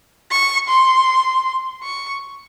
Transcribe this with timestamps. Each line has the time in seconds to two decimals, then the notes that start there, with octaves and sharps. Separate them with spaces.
0.31 C#6
0.69 C6
1.83 C#6